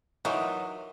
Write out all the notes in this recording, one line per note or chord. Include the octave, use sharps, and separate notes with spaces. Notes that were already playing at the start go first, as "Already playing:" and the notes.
E3 F#3 D#4 F4 A#4